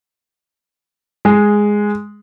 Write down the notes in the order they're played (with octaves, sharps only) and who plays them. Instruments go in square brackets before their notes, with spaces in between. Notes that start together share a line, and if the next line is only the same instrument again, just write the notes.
[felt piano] G#3